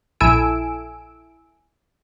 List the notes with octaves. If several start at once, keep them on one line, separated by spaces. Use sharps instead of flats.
A#1 E4 A4 G#5 E6 D7